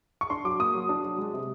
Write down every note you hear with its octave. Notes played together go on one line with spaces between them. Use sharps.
C#6
D4 C6
F#3 D6
A#3 D#6
F#3
D4
F#3
G#3
C3